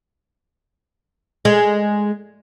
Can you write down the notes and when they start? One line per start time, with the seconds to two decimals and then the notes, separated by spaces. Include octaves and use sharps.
1.45 G#3